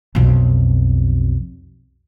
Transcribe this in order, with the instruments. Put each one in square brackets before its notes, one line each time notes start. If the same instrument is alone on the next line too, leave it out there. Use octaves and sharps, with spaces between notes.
[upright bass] B1 F2